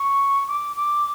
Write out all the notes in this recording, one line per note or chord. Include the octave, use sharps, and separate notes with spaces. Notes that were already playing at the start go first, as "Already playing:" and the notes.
Already playing: C#6
D6
D6